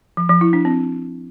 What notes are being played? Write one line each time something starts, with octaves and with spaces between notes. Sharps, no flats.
F3
F3
E4
D4
C4